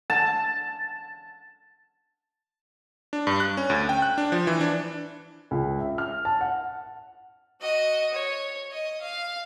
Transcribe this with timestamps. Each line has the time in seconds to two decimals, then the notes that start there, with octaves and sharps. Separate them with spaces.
0.10 A5
3.13 D4
3.27 G2
3.40 F#6
3.57 C#4
3.70 D2
3.89 G5
4.02 F#6
4.18 D4
4.32 F3
4.47 E3
4.61 D4
5.51 C#2
5.79 E5
5.98 F6
6.25 A5
6.41 F#5
7.61 F#4 D#5
8.14 C#5
8.71 D#5
9.01 F5